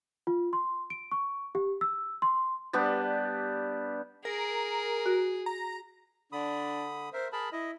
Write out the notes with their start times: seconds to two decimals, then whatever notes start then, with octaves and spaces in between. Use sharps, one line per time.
0.27 F4
0.53 C6
0.90 D7
1.12 C#6
1.55 G4
1.81 E6
2.22 C6
2.73 G3 B3 D4 G4
4.25 G#4 A#4
5.06 F#4
5.46 A#5
6.32 D3 D4 B5 D#6
7.13 A#4 C5 E5
7.32 G#4 A#4 A5 B5
7.53 E4 D#5